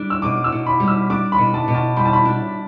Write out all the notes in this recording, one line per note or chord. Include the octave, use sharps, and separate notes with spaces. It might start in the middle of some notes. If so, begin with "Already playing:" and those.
Already playing: G3 D4
E6
B2 D6
E6
B2
B5
G3
E6
D4 D6
B5
B2
A5
B2
A5
G3 B5
A5
B5
D4